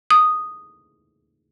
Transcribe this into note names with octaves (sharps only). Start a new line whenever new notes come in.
D#6